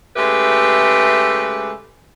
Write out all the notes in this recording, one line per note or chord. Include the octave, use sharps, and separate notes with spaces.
C#3 G#3 A3 G4 B4 E5